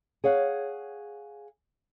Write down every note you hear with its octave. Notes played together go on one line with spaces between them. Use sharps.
G#4 C#5 F5 F#5